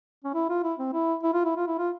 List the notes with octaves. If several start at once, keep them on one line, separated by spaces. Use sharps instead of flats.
C#4
E4
F4
E4
C4
E4
E4
F4
E4
F4
E4
F4